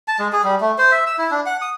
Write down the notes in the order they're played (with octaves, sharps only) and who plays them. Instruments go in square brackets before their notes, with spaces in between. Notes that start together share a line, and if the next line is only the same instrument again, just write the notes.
[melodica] A5
G#3
G#4
G3
A3
C5
E5
E6
E4
D4
F#5
D#6